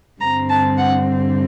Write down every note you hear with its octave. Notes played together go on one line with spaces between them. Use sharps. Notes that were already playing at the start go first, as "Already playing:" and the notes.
G2 D3 G3 C4 A#5
A5
F#5